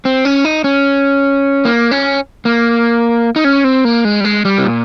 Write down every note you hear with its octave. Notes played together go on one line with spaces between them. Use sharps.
C4
C#4
D#4
C#4
A#3
C#4
A#3
D#4
C#4
C4
A#3
G#3
G3
G#3
G3
C3
A#2